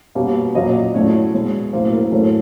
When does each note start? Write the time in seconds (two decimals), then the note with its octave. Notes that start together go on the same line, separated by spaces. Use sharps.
0.15 B2 G3 A#3 C#4
0.55 A#2 F#3 A#3 C#4 D#5
0.75 D5
0.94 A2 F#3 A3 C#4 C#5
1.33 B2 G#3 C#4
1.73 A2 F#3 A#3 C5
1.93 A#4
2.12 A2 F#3 A3 C#4 A4